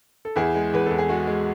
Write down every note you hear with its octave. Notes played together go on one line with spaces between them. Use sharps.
A4
E2 E4 G#4
G#3
E2 B4
E2 A4
G#4
G#3 F#4
G#3